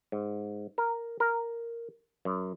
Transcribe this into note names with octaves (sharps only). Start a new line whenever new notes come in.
G#2
A#4
A#4
F#2